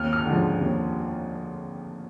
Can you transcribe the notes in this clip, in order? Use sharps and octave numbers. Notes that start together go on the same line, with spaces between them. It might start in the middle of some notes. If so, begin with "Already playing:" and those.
Already playing: D#2 F6
F6
D3 F3 G#3
D#2